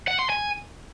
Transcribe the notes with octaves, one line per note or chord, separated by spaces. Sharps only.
F#5
C6
G#5